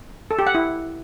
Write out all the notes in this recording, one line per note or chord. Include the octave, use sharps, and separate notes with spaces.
A4
G4
F#5
E4